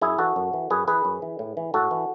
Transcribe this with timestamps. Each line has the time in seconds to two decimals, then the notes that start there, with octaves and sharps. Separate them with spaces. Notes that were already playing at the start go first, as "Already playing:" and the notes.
0.01 F#2 E4 G#4
0.18 E3 F#4 A4
0.36 F#2
0.53 E3
0.70 F#2 G#4 B4
0.88 E3 G#4 B4
1.05 F#2
1.22 E3
1.39 A2
1.57 E3
1.74 A2 F#4 A4
1.91 E3